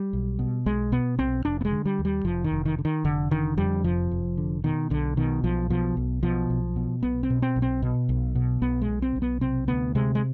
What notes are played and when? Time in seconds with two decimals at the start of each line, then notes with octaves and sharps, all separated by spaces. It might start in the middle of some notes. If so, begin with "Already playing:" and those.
Already playing: G3
0.13 B1
0.39 B2
0.66 B1 G#3
0.92 B2 B3
1.19 B1 C4
1.45 F1 D4
1.61 B3
1.65 G#3
1.72 D3
1.85 G3
1.99 D#2
2.05 G3
2.24 F1 F3
2.44 D#3
2.52 F1
2.65 D#3
2.79 D3
2.85 D#3
3.04 F1 D3
3.31 D3 D#3
3.58 F2 G3
3.84 F1 F3
4.11 F1
4.38 D3
4.64 B2 D#3
4.90 B1 D3
5.17 B2 D#3
5.44 B1 F3
5.70 B2 F3
5.97 B1
6.23 B2 F3
6.50 B1
6.76 B2
7.03 B1 B3
7.23 C4
7.30 B2
7.42 C4
7.56 B1
7.62 C4
7.82 B2
8.09 B1
8.35 B2
8.62 B1 B3
8.82 G#3
8.89 B2
9.02 C4
9.16 B1
9.22 B3
9.41 C3 C4
9.68 D2 B3
9.95 C3 G#3
10.15 G#3